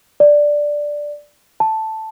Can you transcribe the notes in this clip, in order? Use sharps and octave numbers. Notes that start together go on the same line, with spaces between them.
D5
A5